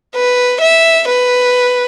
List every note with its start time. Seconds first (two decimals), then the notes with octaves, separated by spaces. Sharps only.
0.15 B4
0.61 E5
1.08 B4